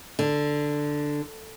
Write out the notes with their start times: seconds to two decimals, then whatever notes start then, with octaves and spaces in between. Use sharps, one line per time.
0.19 D3